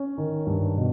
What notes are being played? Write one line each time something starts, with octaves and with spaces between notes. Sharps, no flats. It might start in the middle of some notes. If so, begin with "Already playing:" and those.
Already playing: C#4
D#3
G2
B2